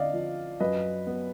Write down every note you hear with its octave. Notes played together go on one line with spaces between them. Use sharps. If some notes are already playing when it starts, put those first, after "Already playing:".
Already playing: D3 D5 D#5 F5
F3
F#2 B4 D#5
B3